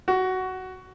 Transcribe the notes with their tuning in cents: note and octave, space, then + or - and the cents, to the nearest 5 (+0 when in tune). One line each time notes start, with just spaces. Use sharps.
F#4 +10